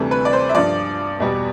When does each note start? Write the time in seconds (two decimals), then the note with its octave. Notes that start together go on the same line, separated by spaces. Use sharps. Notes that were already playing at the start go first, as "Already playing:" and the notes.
Already playing: D2 C3 E3 G3 A4
0.11 B4
0.25 D5
0.33 C5
0.49 E5
0.55 G2 F3 D5
1.20 E2 B2 G3